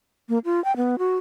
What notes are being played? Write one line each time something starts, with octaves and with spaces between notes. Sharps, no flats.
A#3
F4
G5
B3
F#4